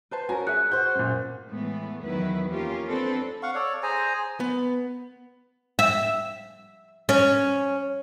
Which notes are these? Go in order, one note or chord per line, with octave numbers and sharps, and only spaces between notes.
B4 C5 A5
C#4 F#4 A#4 G#5 A#5
G#4 E5 F#6 C#7
F#4 C5 G6
F#2 A#2
A2 E3 G#3 A3 B3
E2 D#3 F#3 E4 B4
A#3 C#4 F4 G4
C4 D4 A4 B4 C5
F5 F#5 C#6
A4 C#5 D5
G#4 C5 G#5 A#5
B3
E5
C#4